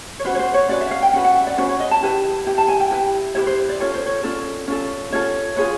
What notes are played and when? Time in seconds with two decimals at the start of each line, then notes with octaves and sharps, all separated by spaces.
0.19 C#5
0.25 C#4 F#4 B4 C5
0.35 C#5
0.39 C5
0.54 C#5
0.69 C#4 F#4 B4 D5
0.81 E5
0.91 F5
1.03 G5
1.13 C#4 F#4 B4 F#5
1.24 F#5
1.35 E5
1.47 D5
1.57 C#4 F#4 B4 C5
1.69 C#5
1.80 D#5
1.91 A5
2.02 E4 G4 B4
2.46 E4 G4 B4
2.58 A5
2.68 G#5
2.80 G5
2.91 E4 G4 B4
3.35 E4 G4 B4 C#5
3.47 C5
3.69 D5
3.80 C#4 F4 A4 C#5
3.94 C5
4.06 C#5
4.23 C#4 F4 A4 D5
4.68 C#4 F4 A4
5.13 C#4 F4 A4 C#5
5.56 F4 G#4 B4 C#5